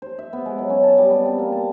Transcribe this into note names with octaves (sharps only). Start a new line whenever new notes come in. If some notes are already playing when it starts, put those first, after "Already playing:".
C5
E5
B3
G#3
F#3
C#4
A5
G3
B3
C4
A#3
A5